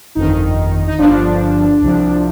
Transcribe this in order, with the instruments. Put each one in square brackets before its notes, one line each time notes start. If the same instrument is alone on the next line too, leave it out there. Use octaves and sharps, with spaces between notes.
[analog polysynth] G1 F2 D#3 D#4
D#4
G1 G2 D3 F3 D4
C2 C3 F3